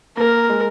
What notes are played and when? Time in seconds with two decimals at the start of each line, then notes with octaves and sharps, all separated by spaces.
0.17 A#3 A#4
0.50 G#3